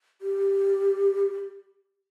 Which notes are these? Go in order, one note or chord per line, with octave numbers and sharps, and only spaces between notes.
G4